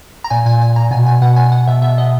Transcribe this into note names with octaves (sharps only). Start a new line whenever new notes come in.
A#5
A#2 G#5
A#2 G#5
A#2 G#5
A#2 A#5
B2 G#5
B2 G#5
B2 F#5
B2 G#5
B2 F#5
B2 E5
B2 E5
B2 D#5